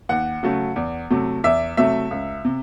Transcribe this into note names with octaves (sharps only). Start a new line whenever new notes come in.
D#2 F#5
C#3 F#3 A3
E2
C3 F#3 A3
E2 E5
C3 F#3 A3 E5
C#2
C3